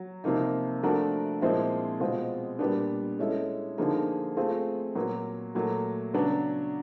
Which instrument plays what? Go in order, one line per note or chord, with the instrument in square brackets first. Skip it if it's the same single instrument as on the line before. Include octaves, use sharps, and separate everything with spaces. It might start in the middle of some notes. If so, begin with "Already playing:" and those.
Already playing: [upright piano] F#3
C3 F3 A#3 D#4
F3 A3 D4 F#4 A#4
A#2 F3 G#3 C4 E4
B2 G#3 C4 F4
A#2 G3 B3 D4
G#3 C#4 E4 A4
D3 F3 A#3 D#4 G#4
A3 C4 F4 G#4
A#2 F#3 B3
A#2 F#3 A3
C#3 F#3 B3 D4